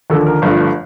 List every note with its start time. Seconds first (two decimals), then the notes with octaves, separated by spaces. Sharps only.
0.10 D#2 D3 F3 A4
0.26 A#4
0.42 G1 G2 F3 A3